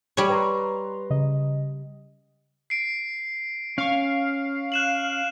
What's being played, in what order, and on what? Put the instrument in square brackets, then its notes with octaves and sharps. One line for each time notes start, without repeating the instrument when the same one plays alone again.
[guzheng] G3 C#5
[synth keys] B4 A#5 C6
C#3 D#5
[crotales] C7 D7
[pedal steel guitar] C#4 C#6 [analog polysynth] F5
[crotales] F#6 E7 F#7